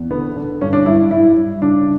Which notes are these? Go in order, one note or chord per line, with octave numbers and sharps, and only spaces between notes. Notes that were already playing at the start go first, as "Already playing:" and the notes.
Already playing: E2
D3 B3
D3
G2 C#4
D4
G2 E4
G2 E4
G2
C#3 D4